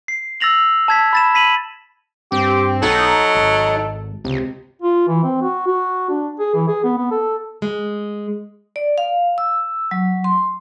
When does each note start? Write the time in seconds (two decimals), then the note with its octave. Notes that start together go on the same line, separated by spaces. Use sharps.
0.08 C7
0.40 E6 A6 A#6 F7 F#7
0.88 A5 G#6 B6
1.13 B5 A6 E7
1.34 B5 B6 D#7 F#7
2.32 G2 C4 G4
2.83 B1 F#3 D#4 A4
3.35 G#1
4.24 C#2 C3
4.82 F4
5.08 E3
5.23 C4
5.42 F#4
5.67 F#4
6.09 D4
6.39 G#4
6.54 E3
6.68 G#4
6.84 B3
6.97 B3
7.11 A4
7.62 G#3
8.76 D5
8.98 F5
9.38 E6
9.91 F#3
10.24 C6